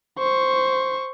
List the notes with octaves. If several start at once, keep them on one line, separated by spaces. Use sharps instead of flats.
C5 C#6